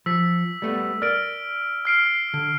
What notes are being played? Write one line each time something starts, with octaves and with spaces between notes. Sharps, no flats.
F3 E6 B6
G3 A3 B3
A#4 D5 F6 D7
F6 C7 D7
C7
D3